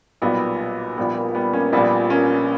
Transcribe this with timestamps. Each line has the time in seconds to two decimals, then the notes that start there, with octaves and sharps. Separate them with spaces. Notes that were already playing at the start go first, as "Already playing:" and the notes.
0.22 B1 A#2 G3 B3
0.97 A#1 A#2 G3 B3
1.16 A#3
1.35 G3 B3
1.53 A#3 C#4
1.72 A#1 A#2 G3 B3
2.10 A#3 C#4